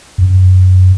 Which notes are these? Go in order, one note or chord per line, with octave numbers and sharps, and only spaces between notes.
F#2